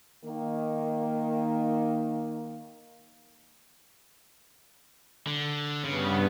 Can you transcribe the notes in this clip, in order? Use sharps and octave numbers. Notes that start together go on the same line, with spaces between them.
D#3 A#3
D3
G2 C#3 B3